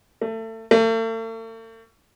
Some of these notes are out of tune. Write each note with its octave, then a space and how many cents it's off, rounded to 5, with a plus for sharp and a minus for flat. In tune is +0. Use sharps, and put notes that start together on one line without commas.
A3 +30
A3 +45